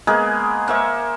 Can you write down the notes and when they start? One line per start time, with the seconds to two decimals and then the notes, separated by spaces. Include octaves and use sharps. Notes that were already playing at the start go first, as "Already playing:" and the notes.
0.07 G#3 A#3 B3 G#4
0.68 A#3 C5 E5 C#6